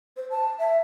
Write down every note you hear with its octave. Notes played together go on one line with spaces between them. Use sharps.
C5
A5
E5